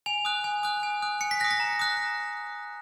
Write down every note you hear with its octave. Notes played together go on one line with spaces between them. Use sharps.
G#5 F7
D#6 F#6
G#5
D#6 F#6
G#5
D#6 F#6
G#5 C#7
B6
D#6 F#6 A#6
A#6
A#5
D#6 F#6